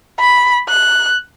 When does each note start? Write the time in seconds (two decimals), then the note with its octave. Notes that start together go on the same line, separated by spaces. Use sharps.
0.20 B5
0.69 F#6